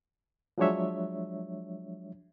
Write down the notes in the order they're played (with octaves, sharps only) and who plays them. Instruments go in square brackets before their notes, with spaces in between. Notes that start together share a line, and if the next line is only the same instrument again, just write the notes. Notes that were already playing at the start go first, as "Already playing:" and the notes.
[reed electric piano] F3 F#3 G#3 D4 C#5 E5